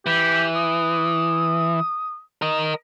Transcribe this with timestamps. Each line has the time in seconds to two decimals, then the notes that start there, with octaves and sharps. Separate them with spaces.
0.06 E3 G4
0.56 D#6
2.42 A#4 D#5